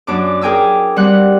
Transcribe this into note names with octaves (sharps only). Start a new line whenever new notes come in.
F#2 D4 D6
G#4 A#4 G5 G#5 D6 E6
G3 C4 F#5 F#6